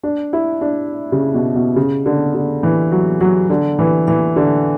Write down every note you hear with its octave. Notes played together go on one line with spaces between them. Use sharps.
D4
E4
D4
C#3
B2
B2
C#3
D3
D3
E3
F#3
F#3
D3
E3
E3
D3